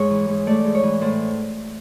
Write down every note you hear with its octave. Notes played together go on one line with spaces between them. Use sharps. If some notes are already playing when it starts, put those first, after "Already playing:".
Already playing: G#2 C#5
E3
G#2
A3 D5
G#2
C#5
E3
A2 C5